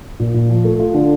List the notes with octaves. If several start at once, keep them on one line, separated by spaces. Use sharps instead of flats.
A#2
A#2
F3
A3
F4
D3